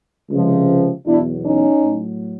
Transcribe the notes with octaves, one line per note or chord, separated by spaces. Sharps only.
C#2 C3 F3
E2 B2 F#3 D4 E4
C#4 D#4
A2 F#3